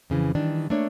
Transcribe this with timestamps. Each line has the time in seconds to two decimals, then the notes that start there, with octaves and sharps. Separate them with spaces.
0.10 F2 C#3 E3
0.35 D#3 E3 G3 D4
0.70 A3 A#3 D4 C#5